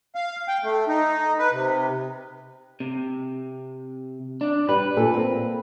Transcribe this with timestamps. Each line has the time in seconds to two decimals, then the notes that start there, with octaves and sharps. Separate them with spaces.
0.15 F5
0.48 G5
0.64 A3
0.88 D#4
1.38 B4
1.52 C3
2.80 C3
4.41 D4
4.69 G3 B4
4.97 A#2 A4
5.14 A#3 C4